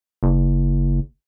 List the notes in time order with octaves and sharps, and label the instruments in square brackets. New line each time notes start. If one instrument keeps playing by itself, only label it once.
[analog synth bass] F#1